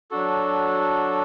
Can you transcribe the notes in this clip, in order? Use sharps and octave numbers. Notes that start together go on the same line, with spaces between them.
F#3 D4 F#4 A4